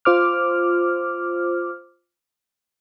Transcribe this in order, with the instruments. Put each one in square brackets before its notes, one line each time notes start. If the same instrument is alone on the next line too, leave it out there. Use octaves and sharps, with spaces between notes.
[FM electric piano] F4 C5 D6 F6